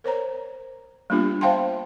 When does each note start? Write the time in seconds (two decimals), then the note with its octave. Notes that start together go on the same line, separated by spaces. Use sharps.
0.04 A#4 C5 C#5 A#5
1.10 G3 A#3 B3 D4 F4 G4
1.41 C5 E5 F5 G5 A5 C6